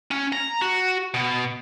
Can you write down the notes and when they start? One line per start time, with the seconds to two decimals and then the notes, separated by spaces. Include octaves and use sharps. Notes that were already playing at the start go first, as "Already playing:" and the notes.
0.11 C#4
0.33 A#5
0.62 F#4
1.14 B2